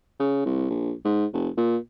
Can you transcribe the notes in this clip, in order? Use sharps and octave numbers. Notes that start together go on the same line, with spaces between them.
C#3
C2
A#1
G#2
F1
A#2